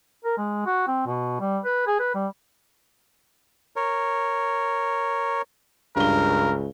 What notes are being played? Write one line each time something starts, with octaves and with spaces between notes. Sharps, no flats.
A#4
G#3
F#4
C4
B2
G3
B4
G#4
B4
G3
A#4 C#5
C#2 G2 A#4 G7